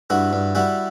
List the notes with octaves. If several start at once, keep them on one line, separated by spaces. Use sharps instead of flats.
G2 E4 F#4
G2
G3 E4 F#4